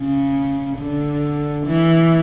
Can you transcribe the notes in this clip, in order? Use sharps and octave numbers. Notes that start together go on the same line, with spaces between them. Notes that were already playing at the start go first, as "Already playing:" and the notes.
Already playing: C#3
D3
E3